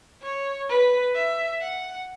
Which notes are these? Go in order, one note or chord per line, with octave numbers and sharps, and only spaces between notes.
C#5
B4
E5
F#5